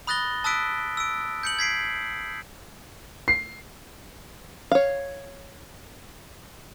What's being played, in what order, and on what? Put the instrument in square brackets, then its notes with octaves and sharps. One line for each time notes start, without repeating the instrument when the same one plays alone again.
[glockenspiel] B5 D#6 F#6 A6 A#6 G7
A5 D#6 E6 F#6 B6 D7
E6 D7
G6 C#7 F#7
G#6 B6 C7 D7
[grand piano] C7
[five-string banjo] C#5 F5